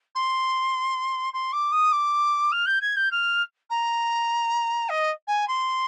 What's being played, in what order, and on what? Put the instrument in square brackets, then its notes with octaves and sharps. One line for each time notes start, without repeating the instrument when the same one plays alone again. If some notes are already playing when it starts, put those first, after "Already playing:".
[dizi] C6
C6
D6
D#6
D6
F6
G6
G#6
G6
F6
A#5
D#5
G#5
C6